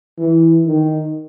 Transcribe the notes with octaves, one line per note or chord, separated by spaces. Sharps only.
E3
D#3